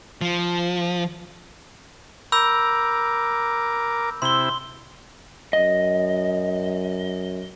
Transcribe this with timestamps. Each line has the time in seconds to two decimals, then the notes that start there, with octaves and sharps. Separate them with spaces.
0.21 F3
2.32 A#4 B5 D6 E6 G6
4.22 C3 E4 C6 G7
5.53 F#2 D#5